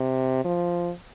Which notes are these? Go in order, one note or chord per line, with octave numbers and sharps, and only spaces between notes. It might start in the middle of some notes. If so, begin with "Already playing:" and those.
Already playing: C3
F3